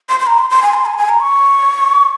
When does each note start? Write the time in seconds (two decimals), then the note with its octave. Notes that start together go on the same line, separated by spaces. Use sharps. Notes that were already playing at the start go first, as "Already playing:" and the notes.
0.09 C6
0.20 C6
0.27 A#5
0.39 C6
0.50 C6
0.63 G#5
0.74 C6
0.86 G#5
0.94 A#5
0.97 G#5
1.09 A#5
1.21 C#6